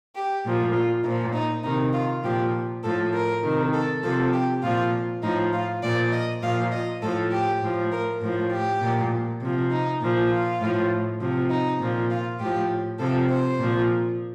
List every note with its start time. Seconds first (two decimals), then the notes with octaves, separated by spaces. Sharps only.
0.15 G4
0.45 A#2 F3
0.74 F4
1.04 A#2 F3 D#4
1.34 D#4
1.63 C3 D#3 D#4
1.94 F4
2.24 A#2 F3 G4
2.83 A2 F3 A4
3.13 A#4
3.44 C3 D#3
3.73 A4
4.03 C3 F3 A4
4.33 G4
4.63 A#2 F3 F4
5.22 A2 F3 D#4
5.52 F4
5.82 A#2 F3 D5
6.12 D#5
6.42 A#2 F3 F5
6.71 D#5
7.02 A2 F3 A4
7.32 G4
7.62 A2 F3
7.91 A#4
8.21 A2 F3
8.51 G4
8.81 A#2 F3
9.40 C3
9.45 F3
9.71 D#4
10.01 A#2 F3
10.30 F4
10.61 A2 F3
11.20 C3 F3
11.50 D#4
11.80 A#2 F3
12.10 F4
12.39 A2 F3 G4
12.99 C3 F3 A4
13.30 C5
13.60 A#2 F3